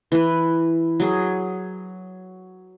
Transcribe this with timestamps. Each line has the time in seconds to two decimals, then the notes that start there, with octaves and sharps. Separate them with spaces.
0.12 E3 B4
1.00 F#3 G#4